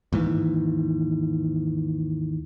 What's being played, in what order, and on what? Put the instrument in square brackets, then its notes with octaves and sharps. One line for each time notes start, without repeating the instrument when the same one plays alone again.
[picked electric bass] D#2 G#2 E3